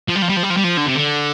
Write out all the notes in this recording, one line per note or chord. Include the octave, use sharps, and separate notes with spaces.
F3
G3
F3
G3
F3
G3
F3
G3
F3
D3
C3
D3